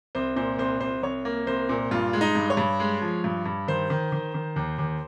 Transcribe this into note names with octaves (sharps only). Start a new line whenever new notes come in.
C2 C5
A#2 C5
C2 C5
C2 C5
C2 C#5
A#3
C2 C5
A#2
G2 F4
G#3
D#4
G2
C#5
G2
G#3
F3
G2
G2
D#3 C5
D#3
D#3
D#3
D#2
D#2